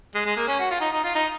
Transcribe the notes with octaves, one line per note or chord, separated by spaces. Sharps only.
G#3
G#3
A#3
C#4
F#4
F4
D#4
D#4
F4
D#4